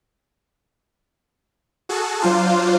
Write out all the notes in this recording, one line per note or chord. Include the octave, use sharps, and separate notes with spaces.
F#4 G#4 A4 A5
F#3 D4 F4 C5 F5